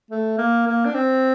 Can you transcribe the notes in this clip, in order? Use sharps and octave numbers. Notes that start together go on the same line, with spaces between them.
A3
A#3
A#3
D4
C4